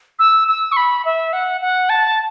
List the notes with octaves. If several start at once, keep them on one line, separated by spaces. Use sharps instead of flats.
E6
E6
C#6
B5
E5
F#5
F#5
A5